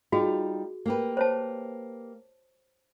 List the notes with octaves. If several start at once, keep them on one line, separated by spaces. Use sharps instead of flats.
G3 D#4 F4 F#4 G#4
A#3 G4 B4
C5 C#5 A5